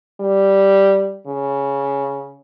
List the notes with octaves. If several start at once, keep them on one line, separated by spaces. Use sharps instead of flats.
G3
C#3